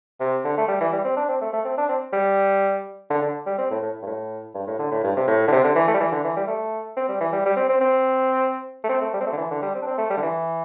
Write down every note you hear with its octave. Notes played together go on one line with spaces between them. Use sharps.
C3
D3
A3
G3
E3
G3
C4
D4
C4
A3
A3
C4
D4
C4
G3
D3
D3
G3
C4
A2
A2
G2
A2
G2
A2
D3
A2
G2
C3
A2
D3
C3
D3
E3
A3
G3
E3
D3
E3
G3
A3
C4
G3
E3
G3
G3
C4
C4
C4
A3
C4
A3
G3
C4
A3
D3
E3
D3
G3
C4
D4
C4
A3
G3
D3
E3